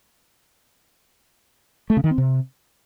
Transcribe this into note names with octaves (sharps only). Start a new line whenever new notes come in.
A3
C#3
D#3
C4
C3